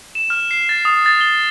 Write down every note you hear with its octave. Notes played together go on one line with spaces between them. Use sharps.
E7
F6
C7
A6
D#6
A6
G7